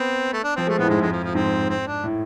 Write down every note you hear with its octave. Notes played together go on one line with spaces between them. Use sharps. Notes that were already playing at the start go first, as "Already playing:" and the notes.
Already playing: B3 C4
A3
D4
F3 C4
G#3 A3
A2 B3
F2
G#2 G#3
F2 G#3
F3
F3
G#2 C4
C4
D4
A2